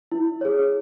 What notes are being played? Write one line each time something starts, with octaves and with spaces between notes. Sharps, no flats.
E4
G#4 C#5